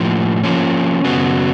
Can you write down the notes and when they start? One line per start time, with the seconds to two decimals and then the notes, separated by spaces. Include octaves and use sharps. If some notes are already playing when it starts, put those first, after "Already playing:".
Already playing: A2 F3 A#3
0.43 F3 A#3 C#4
1.04 F#2 C#3 F#3 B3